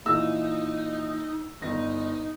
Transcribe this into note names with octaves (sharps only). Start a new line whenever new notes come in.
A#2 E3 D#4 E6
G1 D#4 A#6